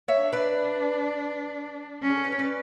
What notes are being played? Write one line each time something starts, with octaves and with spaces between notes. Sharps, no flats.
C#5 E5
D4
B4 D5
C#4
G#4
A4
B4
C#5
B4 D5